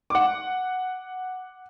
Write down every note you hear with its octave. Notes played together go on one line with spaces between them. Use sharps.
F#5 D6